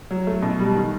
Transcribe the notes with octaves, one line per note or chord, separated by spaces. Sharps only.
F#3
A3
B2
G3
D#3